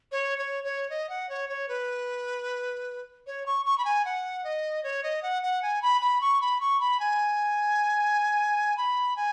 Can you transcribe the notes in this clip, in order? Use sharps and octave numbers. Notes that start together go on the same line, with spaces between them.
C#5
C#5
C#5
D#5
F#5
C#5
C#5
B4
C#5
C#6
C#6
B5
G#5
F#5
D#5
C#5
D#5
F#5
F#5
G#5
B5
B5
C#6
B5
C#6
B5
G#5
B5
G#5